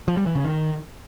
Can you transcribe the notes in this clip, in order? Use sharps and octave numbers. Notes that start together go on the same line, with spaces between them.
F3
G3
E3
C#3
D#3